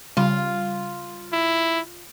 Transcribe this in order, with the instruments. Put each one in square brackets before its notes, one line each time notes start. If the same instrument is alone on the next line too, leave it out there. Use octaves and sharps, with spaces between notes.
[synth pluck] C#3 G3 [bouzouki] F4
[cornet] E4